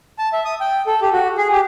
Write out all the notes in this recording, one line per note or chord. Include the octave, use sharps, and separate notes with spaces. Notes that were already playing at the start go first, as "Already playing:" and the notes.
A5
E5
D#6
G5
A4
G4
F#4
G#4
G4